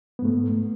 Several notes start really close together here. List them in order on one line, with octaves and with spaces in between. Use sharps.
B3 G#2 A3